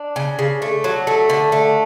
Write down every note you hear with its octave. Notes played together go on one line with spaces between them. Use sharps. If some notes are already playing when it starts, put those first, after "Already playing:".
Already playing: D4
C#3
C#3
A3
F#3
A3
D3
A3